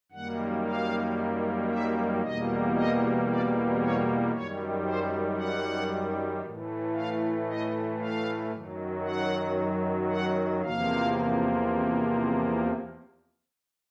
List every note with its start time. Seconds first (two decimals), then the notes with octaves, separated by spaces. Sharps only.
0.12 F#2 D#3 G3 A#3 F#5
0.64 F5
1.69 E5
2.22 E2 B2 G3 A#3 D#5
2.74 D#5
3.26 D5
3.79 C#5
4.31 F#2 D#3 G3 C#5
4.84 C5
5.36 F#5
6.42 A2 E3 A3
6.94 F5
7.46 D#5
7.99 F5
8.52 F#2 D#3 F#3
9.03 F#5
10.09 F#5
10.62 E2 C3 F3 A#3 F5